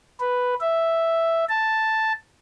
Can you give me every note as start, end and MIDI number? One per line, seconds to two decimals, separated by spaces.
0.20 0.55 71
0.60 1.44 76
1.49 2.13 81